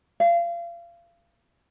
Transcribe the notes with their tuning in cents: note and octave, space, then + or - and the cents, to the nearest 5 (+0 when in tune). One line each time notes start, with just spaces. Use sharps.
F5 -30